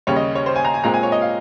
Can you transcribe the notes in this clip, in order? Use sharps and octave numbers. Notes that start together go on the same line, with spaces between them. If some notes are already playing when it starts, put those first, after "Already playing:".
D#2 C#3 G3 C#5
D#5
C#5
C5
G#5
A#5
G#5
A#2 G#3 C4 A#5
G#5
C#5
D#5
F5